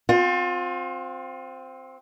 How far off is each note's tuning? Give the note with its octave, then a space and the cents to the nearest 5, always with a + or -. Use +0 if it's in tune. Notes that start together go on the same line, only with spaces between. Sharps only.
C4 +0 F4 +35